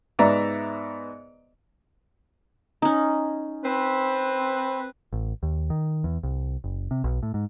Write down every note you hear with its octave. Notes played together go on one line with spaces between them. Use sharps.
G#2 B3 D5 E5 A#5
C#4 D#4
C4 B4
A1
D#2
D#3
E2
C2
F#1
C3
B1
A2
G#2